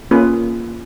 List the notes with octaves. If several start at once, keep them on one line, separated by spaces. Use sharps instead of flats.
A#3 C#4 F4 G#4 B4